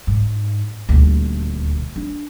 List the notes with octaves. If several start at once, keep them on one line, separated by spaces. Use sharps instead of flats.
G#2
D#1 D2
D4